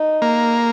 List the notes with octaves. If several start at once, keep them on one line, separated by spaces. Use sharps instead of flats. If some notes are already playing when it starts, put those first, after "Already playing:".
Already playing: D#4
A#3